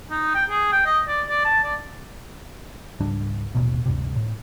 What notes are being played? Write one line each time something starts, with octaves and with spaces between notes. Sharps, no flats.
D#4
G5
G#4
G5
D#5
D5
D5
A5
D5
C#2 G#2 G3 D4
D#1 A1 B2
D2 G2 C3
A2